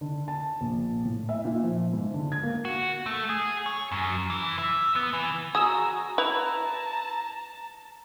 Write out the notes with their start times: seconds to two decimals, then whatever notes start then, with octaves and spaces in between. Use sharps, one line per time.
0.01 D3
0.28 A5
0.61 A#1
1.05 A2
1.29 E5
1.45 A#2
1.63 F3
1.93 G#2
2.14 D3
2.32 G#6
2.43 A#3
2.65 F#4
3.06 A3
3.29 G#4
3.66 C#5
3.92 F#2
4.30 E3
4.59 E5
4.96 B3
5.13 E3
5.55 F#4 G#4 A#5 D#6 E6 E7
6.18 E4 B4 A5 A#5 F7